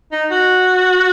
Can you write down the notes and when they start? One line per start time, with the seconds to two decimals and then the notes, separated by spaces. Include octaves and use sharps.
0.12 D#4
0.31 F#4